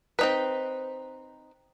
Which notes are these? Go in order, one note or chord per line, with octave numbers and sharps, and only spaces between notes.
C4 D#4 B4